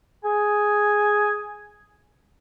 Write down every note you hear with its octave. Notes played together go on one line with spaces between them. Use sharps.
G#4 G#5